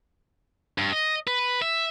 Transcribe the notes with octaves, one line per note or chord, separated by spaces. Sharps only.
G2
D#5
B4
E5